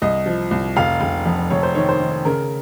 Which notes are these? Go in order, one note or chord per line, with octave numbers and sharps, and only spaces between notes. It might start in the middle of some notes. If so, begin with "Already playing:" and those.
C2 D#5
F3
C2
F1 F5
F1
F2
F1 C#5
C5
D#3 C#5
C5
D#3
C#3 A#4